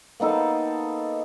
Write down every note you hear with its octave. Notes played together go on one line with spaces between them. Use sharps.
A#3 B3 D#4 A4